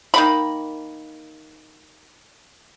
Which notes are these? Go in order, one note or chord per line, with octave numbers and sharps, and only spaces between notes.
D#3 A#3 B5